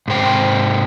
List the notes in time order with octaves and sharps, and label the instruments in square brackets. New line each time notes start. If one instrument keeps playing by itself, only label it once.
[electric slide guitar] G#2 C3 C5 G5